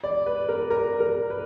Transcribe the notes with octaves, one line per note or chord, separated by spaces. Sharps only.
D5
B4
A#4
A#4
A#4
B4